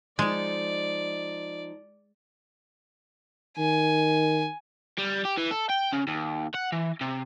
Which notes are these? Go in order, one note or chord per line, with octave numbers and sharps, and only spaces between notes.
F3 G#3 D#4 D5
D#3 G#5
G3
G4
E3
A4
G5
C#3
D#2
F#5
E3
C3